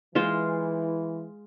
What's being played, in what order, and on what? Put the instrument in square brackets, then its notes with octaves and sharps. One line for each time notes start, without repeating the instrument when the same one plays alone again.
[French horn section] E3 [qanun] G#3 F4 C5